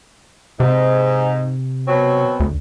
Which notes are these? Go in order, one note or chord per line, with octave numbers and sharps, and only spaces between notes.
G#2 C3
B2 F#3 C4
D2